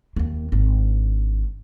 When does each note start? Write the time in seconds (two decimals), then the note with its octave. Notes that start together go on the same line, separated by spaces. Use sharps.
0.16 D#2 A#3
0.52 G#1 D4